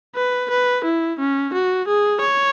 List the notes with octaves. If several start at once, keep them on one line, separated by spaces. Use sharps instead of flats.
B4
B4
E4
C#4
F#4
G#4
C#5